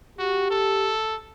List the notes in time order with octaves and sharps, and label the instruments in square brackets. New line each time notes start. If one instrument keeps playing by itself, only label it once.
[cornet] F#4 [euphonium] G4
[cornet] A4